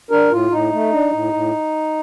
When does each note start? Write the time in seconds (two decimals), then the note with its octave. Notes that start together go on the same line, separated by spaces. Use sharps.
0.11 D4 A#4
0.31 A2 F4
0.51 A2 D#4
0.72 A3
0.92 D4
1.13 A2
1.33 A2